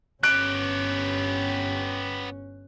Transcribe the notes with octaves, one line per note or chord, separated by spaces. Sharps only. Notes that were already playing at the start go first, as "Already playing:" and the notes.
G1 B3 C#4 G4 F#6 D7